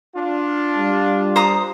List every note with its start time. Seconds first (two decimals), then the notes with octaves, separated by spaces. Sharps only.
0.15 D4 F4
0.77 G3
1.36 C5 A#5 D#6